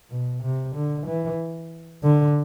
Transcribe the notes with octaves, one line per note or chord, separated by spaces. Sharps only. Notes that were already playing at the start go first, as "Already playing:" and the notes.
B2
C3
D3
E3
D3